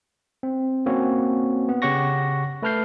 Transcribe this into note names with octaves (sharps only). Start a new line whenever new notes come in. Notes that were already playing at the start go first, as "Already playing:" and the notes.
C4
A#3 C4 C#4 F#4 C#5
B3
C#3 G4 C#5 F#5 C#6 A#6
A3 B4 A5 F6 G6 C7